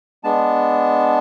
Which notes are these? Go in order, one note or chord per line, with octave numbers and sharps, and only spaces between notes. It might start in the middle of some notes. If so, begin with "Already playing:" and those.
G#3 B3 D4 A5